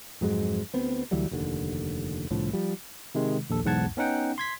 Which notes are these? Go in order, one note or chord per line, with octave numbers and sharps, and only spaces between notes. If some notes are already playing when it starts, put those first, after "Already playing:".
F2 G#2 F#3 G#3
D2 B3 C4
D2 E3 F#3 G3
F1 D#2 A#2 D3
C2 A2 D3 F3
F3 G3
C3 D#3 G#3
A#1 D#2 A4
B1 E2 G#2 F#5 A5 G#6
B3 C#4 D#4 F#5 G5
C6 G#6 B6